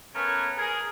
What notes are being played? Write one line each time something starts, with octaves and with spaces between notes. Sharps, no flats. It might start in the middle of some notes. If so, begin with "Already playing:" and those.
A3 B3 C#4 A#4 C#5 G#5
G#4 A#4